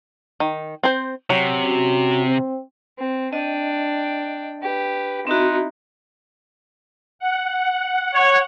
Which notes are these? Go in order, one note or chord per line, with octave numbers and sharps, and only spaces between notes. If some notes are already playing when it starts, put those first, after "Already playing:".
D#3
C4 C5
C3 F#3
C#4 F#4
C4
C4
D4 D#5 G5
G4 B4
C4 D#4 E4 F#4
F#5
C#5